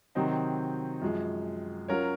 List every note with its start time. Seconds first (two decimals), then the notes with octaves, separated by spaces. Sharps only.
0.15 C3 D#3 F#3 C4 D#4
1.02 F#2 F3 G#3
1.88 F#3 C#4 F4 A#4 C#5